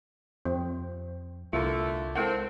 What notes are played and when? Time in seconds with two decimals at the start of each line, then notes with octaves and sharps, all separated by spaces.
0.45 F2 C4
1.53 C2 D3 A3 E4 F4 A#4
2.15 G#3 C4 E4 A4 A#4 F#5